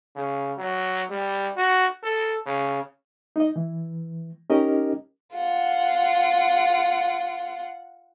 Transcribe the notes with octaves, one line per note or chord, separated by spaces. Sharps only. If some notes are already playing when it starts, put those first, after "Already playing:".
C#3
F#3
G3
F#4
A4
C#3
D#4 D#5
E3
C#4 D#4 G4 A#4 D#5
F4 F#5